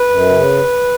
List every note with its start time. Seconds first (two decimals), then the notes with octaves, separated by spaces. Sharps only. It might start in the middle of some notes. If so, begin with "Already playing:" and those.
Already playing: B4
0.09 F#2
0.29 C#3